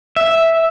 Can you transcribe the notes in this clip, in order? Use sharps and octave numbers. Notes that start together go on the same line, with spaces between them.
E5